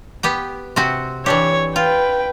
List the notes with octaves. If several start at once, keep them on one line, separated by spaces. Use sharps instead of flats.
B3 G4 G5
C3 C4 F#4
E3 D4 G4 C#5
F4 B4 G5